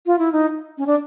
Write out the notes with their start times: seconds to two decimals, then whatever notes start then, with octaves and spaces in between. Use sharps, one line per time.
0.06 F4
0.19 E4
0.32 D#4
0.78 C#4
0.87 D4